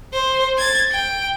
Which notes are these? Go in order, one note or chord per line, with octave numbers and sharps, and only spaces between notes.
C5
G#6 A6
G5